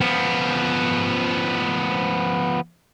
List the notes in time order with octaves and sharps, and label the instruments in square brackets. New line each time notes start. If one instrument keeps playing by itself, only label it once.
[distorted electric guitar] F3 B3